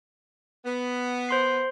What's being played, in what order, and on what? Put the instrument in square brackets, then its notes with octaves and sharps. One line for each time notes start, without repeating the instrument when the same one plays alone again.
[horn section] B3
[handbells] C5 C6 C7